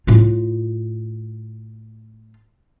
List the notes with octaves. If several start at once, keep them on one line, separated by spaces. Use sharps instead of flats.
A2 F4